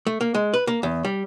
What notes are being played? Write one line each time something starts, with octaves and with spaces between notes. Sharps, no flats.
A3
A#3
G#3
B4
A#3
E2
G3